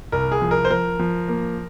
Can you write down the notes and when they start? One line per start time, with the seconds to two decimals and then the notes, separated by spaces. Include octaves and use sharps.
0.12 C2 A#4
0.32 G#4
0.42 F3
0.51 A#4
0.65 C5
0.70 F3 A#4
0.99 F3
1.28 A#3